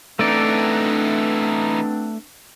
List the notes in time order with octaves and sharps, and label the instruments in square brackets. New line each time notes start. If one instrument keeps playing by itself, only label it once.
[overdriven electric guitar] E3 D#4 [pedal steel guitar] A3 D5 [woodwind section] B3 C4 D4